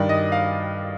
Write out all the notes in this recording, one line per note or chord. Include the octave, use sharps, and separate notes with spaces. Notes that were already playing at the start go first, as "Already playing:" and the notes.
Already playing: G2 D#3 D5
D#5
F5